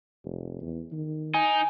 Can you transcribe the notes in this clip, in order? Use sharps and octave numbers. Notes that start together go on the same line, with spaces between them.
F1
E2
D#3
D#4 G#5